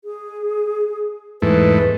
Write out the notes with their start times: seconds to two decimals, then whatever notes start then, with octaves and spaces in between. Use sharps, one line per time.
0.05 G#4
1.42 E2 G#2 A3 B4